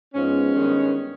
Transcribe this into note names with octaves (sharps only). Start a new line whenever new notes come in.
G#2 F3 G#3 B3 C#4
G2 D#3 G#3 B3